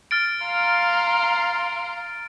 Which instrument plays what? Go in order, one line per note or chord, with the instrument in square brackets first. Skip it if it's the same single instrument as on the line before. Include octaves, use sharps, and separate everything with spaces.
[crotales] F6 A6 D7
[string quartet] F5 A#5 C6